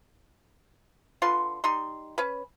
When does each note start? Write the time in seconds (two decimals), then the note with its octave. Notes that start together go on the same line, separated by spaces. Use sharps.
1.22 D3 F4 B4 C6
1.64 G3 D#4 C6
2.18 C#4 B4